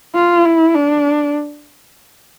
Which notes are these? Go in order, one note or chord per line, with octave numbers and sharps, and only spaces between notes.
F4
E4
D4